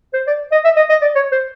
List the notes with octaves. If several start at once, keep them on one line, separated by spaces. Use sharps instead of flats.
C5
D5
D#5
E5
D#5
D#5
D5
C#5
C5